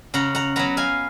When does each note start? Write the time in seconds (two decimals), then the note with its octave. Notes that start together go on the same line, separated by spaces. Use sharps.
0.14 C#3 F#5 A#5
0.35 F#5 A#5
0.56 F#3 B3 F#5 A#5
0.77 F5 G#5